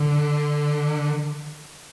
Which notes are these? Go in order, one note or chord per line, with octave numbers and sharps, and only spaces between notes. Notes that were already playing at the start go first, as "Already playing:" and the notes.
Already playing: D3